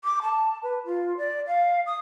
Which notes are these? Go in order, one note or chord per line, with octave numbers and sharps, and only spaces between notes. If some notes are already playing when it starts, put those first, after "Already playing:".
D6
A5
B4
F4
D5
F5
D#6